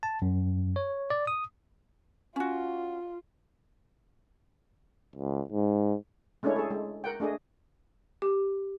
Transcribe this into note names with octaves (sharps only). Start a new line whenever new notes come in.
A5
F#2
C#5
D5
D#6
C#4 F4 F#4
C#2
G#2
G#3 A3 C#4 D4 E4 C#5
G#4 A4
G#3
A#4 F#5 G5
A3 D4 G#4 D#5
G4